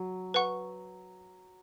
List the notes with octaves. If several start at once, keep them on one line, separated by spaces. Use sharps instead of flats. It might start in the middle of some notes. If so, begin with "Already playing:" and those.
Already playing: F#3
B4 F#5 C#6